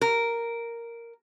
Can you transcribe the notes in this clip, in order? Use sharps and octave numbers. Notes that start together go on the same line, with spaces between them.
A#4